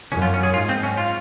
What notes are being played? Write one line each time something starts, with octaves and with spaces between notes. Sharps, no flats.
F#2 C#4
F4
C#4
G#4
G#2 F4
C4
C#4
F4